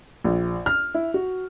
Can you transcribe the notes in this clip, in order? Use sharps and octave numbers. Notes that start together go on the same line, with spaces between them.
A#1
F6
E4
F#4